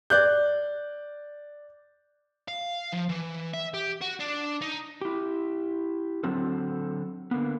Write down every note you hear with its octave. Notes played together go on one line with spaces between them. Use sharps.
D5 F#6 G6
F5
F3
E3
E5
G4
F#4
D4
D#4
E4 G4
D3 F#3 C4 A4
D3 A#3 B3